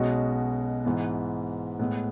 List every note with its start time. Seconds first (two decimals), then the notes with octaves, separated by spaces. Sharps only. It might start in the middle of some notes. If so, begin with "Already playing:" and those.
Already playing: B1 B2 G#3 C#4 F#4
0.85 G#2 E3 B3
1.79 A2 G#3 B3